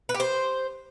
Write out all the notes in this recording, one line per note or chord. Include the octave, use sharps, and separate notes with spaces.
B4
G4
C5